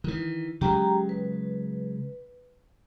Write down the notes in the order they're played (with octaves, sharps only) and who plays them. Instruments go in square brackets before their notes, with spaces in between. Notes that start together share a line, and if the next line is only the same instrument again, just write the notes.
[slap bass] D#3 E3
[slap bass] C#3 F#3 G#3 [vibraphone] G4 G5 A#5
[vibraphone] B4